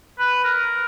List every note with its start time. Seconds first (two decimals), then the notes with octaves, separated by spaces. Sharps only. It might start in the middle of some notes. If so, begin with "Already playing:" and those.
0.19 B4
0.44 A#4